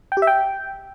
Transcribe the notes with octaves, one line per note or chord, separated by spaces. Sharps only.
G5
G4
E5
G5